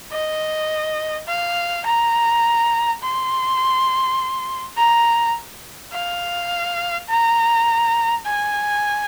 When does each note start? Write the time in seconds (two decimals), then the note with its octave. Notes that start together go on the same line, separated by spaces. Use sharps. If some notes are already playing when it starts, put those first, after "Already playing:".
0.12 D#5
1.28 F5
1.86 A#5
3.03 C6
4.77 A#5
5.93 F5
7.09 A#5
8.25 G#5